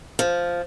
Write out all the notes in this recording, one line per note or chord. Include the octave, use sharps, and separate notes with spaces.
F3